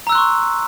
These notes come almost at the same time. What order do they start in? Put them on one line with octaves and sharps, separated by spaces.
A#5 E6 F#6 C6 C#6